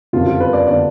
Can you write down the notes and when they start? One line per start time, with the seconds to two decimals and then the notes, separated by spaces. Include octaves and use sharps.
0.13 F#1 F2 D3 F4
0.27 F4
0.40 B4
0.53 D5
0.67 D3 D5